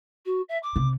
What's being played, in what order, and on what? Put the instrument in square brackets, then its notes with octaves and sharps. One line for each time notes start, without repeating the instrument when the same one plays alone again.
[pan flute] F#4
E5
D6
[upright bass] C3